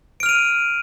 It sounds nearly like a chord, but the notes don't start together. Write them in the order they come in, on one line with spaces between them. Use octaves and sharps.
D7 F6 F7 D#7